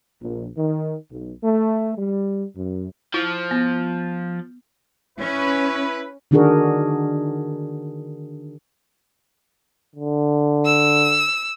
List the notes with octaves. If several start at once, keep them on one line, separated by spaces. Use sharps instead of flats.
A#1
D#3
B1
A3
G3
F#2
F3 E4
B3
C#4 E4 B4
D3 D#3 D4 F#4 G#4 A#4
D3
E6